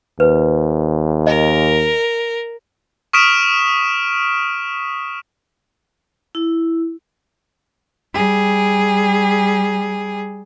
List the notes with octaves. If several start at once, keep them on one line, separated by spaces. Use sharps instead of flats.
D#2 B4
A#4 D#5
C#6 D#6 F6 B6 D7 E7
E4
G3 G#4